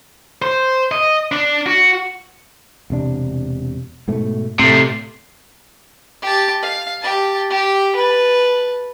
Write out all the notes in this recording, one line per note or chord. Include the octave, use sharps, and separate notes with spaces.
C5
D#5
D4
F#4
E1 C3 D4
G#2 B2 A3
A2 C3 A3 C7
G4 A5
F5
G4 A5
G4
B4 A5